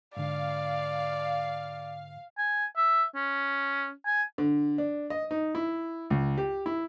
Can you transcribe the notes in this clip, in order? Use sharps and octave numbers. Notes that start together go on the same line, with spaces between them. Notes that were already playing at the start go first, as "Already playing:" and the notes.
G#2 D3 D5 F5
G#5
E5
C#4
G#5
D3
D4
D#5
D#4
E4
C#2
G4
E4